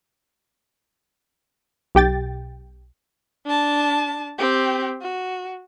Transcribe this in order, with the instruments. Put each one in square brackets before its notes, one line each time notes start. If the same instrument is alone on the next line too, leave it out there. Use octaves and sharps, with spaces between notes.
[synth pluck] B1 G4 G5 A6
[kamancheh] D4 A5
C4 G4
F#4